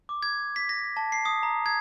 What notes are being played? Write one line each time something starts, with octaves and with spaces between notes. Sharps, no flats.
D6
G#6
B6
A#6
A5
C7
D#6
A#5
G#6